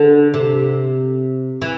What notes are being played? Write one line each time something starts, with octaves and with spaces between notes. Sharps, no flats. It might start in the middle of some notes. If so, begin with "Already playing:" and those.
Already playing: D3
C3
E3